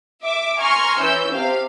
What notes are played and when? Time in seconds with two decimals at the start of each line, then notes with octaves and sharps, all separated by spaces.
0.22 E5 D6
0.58 G#5 A#5 C6 C#6 F6
1.00 E3 C#4 E6 G6
1.33 C3 G4 F5